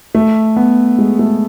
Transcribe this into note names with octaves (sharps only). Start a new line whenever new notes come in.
A3
B3
G#3
A3